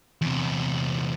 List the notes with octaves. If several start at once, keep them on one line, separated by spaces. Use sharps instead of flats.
E2 C3